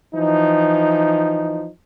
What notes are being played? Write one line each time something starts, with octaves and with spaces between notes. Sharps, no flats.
E3 F3 D#4